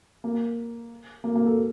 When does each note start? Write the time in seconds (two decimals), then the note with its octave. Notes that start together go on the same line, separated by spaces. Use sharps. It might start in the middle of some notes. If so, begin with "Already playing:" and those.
0.24 A#3
1.24 A#3
1.35 A#3
1.47 A4